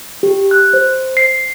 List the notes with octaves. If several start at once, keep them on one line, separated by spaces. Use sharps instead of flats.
G4
F#6
C5
C7